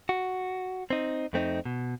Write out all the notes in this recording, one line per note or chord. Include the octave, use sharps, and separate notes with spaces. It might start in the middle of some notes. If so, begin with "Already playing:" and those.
F#4
C4 D#4
F2 A3 C4 D4 D#4
B2